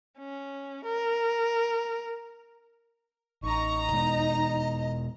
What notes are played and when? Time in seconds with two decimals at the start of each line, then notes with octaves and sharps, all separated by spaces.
0.18 C#4
0.85 A#4
3.43 A1 D#4 A#5 C#6
3.92 B2 G#3 B3 D#5